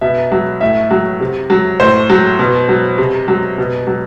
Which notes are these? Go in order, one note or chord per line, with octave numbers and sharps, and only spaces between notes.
B2 E5
F#3
A2 E5
F#3
C3
F#3
A2 C5
F#3
B2
F#3
C3
F#3
B2
F#3